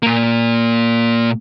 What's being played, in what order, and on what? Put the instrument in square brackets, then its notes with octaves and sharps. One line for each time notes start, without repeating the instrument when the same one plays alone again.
[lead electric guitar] A#2 A#3